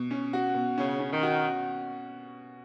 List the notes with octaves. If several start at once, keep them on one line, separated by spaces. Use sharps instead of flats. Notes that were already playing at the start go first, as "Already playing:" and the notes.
Already playing: B2
C#4
F#4
B2
C#3 C#4
C#4
D#3
F#4